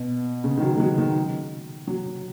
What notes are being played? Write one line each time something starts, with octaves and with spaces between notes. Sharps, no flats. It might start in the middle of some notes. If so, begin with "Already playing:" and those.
Already playing: B2
C#3
D#3
F#3
G#3
F#3
D#3
F#3